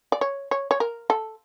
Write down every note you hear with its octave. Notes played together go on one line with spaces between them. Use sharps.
D5
C#5
C#5
C#5
A#4
A4